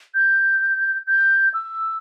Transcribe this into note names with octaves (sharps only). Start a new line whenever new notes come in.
G6
G6
E6